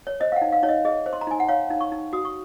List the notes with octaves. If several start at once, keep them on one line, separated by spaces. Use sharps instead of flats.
C#5
C5 D#5
F5
F#5
D#4
F5
D#4 C#5
D#5
G#4 D#5
C5
C6
A#5
D#4 G#5
F#5
C#5 F5
D#4
C#6
D#4
F#4 D#6
C#6